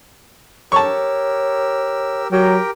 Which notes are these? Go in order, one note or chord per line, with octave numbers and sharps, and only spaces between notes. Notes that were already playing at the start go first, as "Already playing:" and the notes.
G4 A#4 C#5 A5 C#6 E6
F#3 G4 A#4 G5